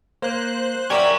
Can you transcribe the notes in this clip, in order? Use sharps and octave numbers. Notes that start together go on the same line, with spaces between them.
A#3 C5 F#6
C#4 F#4 G4 A#4 D5 E5 G#6 B6